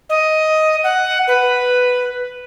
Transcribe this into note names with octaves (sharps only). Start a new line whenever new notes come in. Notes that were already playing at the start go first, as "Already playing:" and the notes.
D#5
F#5
B4